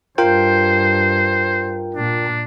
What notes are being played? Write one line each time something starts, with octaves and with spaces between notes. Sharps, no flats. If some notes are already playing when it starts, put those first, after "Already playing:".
G2 F4 A#4 C5 G5
A#2 D4